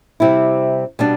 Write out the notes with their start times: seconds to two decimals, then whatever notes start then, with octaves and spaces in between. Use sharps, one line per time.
0.20 C3 G3 C4 E4
0.99 B2 G3 D4